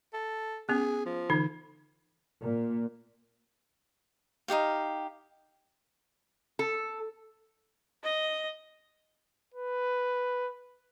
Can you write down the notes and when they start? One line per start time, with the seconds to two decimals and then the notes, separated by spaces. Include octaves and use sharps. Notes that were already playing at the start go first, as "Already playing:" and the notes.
0.14 A4
0.69 B3 C#4 G#4
1.06 F3
1.30 D3 E3 D#4
2.41 A#2
4.48 D#4 F4 G4 F5
6.59 A4
8.04 D#5
9.54 B4